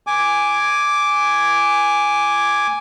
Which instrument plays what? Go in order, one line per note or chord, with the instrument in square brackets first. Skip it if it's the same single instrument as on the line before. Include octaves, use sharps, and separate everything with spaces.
[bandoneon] G#5 D6